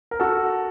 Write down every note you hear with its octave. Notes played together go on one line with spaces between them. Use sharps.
A#4
F#4 A4